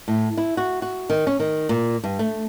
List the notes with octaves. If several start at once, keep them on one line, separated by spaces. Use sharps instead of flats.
A2
E4
F#4
F#4
D#3
C#4
D#3
A#2
G2
A3